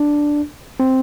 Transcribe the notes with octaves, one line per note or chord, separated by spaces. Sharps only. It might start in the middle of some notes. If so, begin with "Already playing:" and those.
Already playing: D4
C4